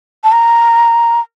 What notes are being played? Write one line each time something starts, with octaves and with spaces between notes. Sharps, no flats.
A5
A#5